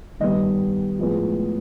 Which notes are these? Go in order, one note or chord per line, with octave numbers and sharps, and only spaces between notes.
G2 D#3 G3 B3 D#5
A2 F3 G#3 B3